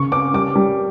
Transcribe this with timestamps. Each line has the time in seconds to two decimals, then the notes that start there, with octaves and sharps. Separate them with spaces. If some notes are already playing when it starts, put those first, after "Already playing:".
Already playing: C#3 C#6
0.11 C#4 D6
0.34 G3 D6
0.55 G3